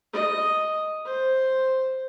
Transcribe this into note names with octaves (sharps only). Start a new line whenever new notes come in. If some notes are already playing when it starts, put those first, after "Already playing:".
D#5
C5